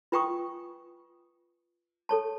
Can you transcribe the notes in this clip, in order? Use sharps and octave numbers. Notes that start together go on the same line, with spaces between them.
F4 B4 G5 G#5 C#6 D#6
A4 C#5 A5